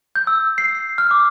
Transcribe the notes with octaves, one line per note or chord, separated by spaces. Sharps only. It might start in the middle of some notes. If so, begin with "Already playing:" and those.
G6
E6
C7
F6
D6